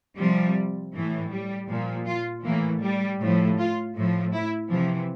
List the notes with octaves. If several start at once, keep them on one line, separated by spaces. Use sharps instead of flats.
C3 F3 G3
A2 E3
G3
A#2 F3
F4
A2 E3 A#3
G3
A2 F3
F4
A2 F3
E4
C3 E3 F3